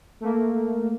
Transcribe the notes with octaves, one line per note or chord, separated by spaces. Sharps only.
A3 A#3